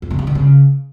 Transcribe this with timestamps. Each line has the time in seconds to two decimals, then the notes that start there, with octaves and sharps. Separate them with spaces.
0.02 F2
0.10 D3
0.19 G2
0.27 D3
0.35 C#3